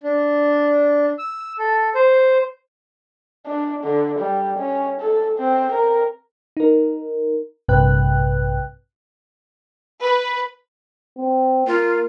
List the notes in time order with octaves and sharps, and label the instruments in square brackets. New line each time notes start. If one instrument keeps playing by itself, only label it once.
[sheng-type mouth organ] D4
E6
A4
C5
[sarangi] D4
D3
G3
C#4
A4
C4
A#4
[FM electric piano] D#4 A#4
A#1 G2 C3 B4 G5 F#6
[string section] B4
[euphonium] C4
[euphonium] A#3 [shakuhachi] F4